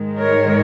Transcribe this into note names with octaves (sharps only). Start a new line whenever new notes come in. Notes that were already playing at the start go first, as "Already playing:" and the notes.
Already playing: G#2 D#3 G#3
A#4 C#5